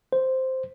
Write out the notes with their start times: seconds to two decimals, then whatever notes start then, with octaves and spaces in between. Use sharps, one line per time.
0.13 C5